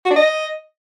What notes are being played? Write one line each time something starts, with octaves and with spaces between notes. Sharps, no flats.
F#4
D4
D#5